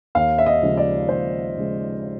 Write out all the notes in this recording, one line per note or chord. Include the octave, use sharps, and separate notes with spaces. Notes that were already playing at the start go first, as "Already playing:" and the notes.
D#2 F5
E5
D#5
C#3 F3 G#3
D5
D#2 C5
C#3 F3 G#3